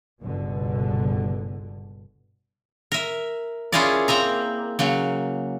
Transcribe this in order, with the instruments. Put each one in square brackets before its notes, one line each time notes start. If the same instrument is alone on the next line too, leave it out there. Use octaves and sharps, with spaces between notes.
[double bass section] G1 C#2 B2 D3
[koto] A#4 E5
C#4 E4 F4 G#4 A#4 D5
A#3 C4 E5 A#5
C#3 F#3 A#3